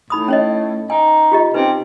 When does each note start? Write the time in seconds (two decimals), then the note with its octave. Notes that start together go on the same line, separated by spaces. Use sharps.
0.10 A2 D#4 B5 D#6
0.28 C#4 C#5 D#5
0.90 D#4 G#5
1.32 F4 G4 D#5
1.54 C3 C#4 D#4 B4